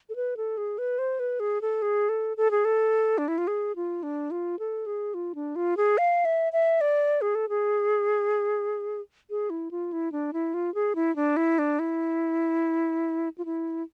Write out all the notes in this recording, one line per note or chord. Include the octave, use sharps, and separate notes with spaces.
A4
B4
A4
G#4
B4
C5
B4
G#4
A4
G#4
A4
A4
G#4
A4
D4
E4
F4
G#4
F4
D4
F4
A4
G#4
F4
D4
F4
G#4
F5
E5
E5
D5
G#4
A4
G#4
G#4
E4
F4
E4
D4
E4
F4
G#4
E4
D4
E4
D4
E4
F4
E4